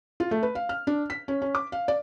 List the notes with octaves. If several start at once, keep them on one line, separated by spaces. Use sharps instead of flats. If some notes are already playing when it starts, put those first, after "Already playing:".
F4
A3
B4
F5
F6
D4
B6
C#4
C#4
D6
F5
D5